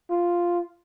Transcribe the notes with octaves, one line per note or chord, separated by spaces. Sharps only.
F4